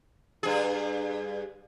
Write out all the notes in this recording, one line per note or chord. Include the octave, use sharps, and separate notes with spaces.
G2 G#4